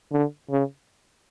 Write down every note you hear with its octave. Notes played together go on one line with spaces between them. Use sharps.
D3
C#3